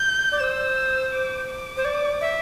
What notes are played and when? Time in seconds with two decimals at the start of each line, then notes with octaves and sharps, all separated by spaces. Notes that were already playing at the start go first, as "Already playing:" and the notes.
Already playing: G6
0.32 D5
0.40 C5 E6
1.13 D6
1.50 D6
1.77 C5
1.85 D5
2.21 E5